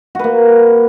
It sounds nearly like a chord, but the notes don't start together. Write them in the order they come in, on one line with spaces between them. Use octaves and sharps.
F#4 B4 A#3